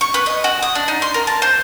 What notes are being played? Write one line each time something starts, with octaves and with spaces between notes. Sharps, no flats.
C#6
B4
D#5
F#4
D#6
D4
D#4
C6
A#4
A5
C5